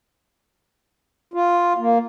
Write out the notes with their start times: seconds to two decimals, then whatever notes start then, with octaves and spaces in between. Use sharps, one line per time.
1.34 F4
1.78 A#3